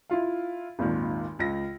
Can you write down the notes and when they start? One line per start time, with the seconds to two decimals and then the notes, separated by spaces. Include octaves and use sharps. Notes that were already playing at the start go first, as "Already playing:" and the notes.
0.10 E4 F4 F5
0.79 G#1 D#2 A#2 D#3
1.39 C#2 A#6